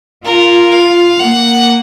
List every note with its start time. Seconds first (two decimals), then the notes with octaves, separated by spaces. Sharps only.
0.25 F4 A#4
0.72 F5
1.19 A#3 F#5